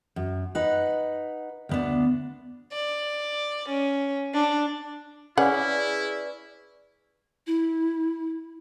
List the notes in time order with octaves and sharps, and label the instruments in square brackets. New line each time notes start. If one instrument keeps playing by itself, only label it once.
[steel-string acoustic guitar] F#2
D#4 B4 F#5
D2 B3 D4
[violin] D5
C#4
D4
[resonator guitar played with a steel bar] C#4 [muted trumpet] E4 [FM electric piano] G#4 B4 D5 [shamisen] F#5
[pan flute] E4